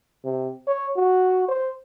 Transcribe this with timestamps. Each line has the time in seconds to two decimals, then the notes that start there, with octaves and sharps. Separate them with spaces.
0.25 C3
0.67 C#5
0.96 F#4
1.49 C5